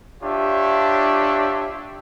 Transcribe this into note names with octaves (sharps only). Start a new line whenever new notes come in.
D4 F4 G4 C#5 E5